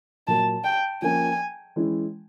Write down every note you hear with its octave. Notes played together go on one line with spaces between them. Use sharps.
A#2 F#3 A#3 A5
G5
F3 A#3 C#4 G#5
E3 G#3 C#4 E4